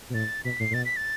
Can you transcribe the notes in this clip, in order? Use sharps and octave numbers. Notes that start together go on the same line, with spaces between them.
B2
A2 A6
B2 B6
A2 C7
A2
B2 A6
B6
A6